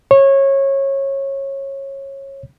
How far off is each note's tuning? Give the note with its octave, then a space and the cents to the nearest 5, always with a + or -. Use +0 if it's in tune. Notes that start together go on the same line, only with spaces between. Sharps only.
C#5 -20